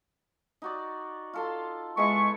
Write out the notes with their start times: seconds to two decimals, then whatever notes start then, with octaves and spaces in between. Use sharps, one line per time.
0.62 D#4 F#4 D5
1.33 F4 A4 C6
1.97 G#3 B3 E4 C#6